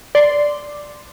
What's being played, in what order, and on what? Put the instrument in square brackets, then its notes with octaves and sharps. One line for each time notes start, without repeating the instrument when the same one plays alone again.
[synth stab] D5 C6